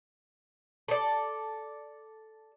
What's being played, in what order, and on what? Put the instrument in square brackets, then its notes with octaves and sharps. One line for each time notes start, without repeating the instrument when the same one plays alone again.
[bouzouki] A4 D5